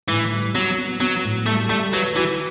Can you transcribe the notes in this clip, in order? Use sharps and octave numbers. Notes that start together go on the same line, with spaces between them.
A2 E3
G3
F#3 B3
B3
F#3 B3
A2
G3 A3
G3 A3
F#3 B4
E3 F#4